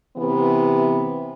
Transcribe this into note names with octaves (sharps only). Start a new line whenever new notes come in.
C3 E3 B3